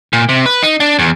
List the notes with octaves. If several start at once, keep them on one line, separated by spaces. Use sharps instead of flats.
A#2
C3
B4
D#4
D4
E2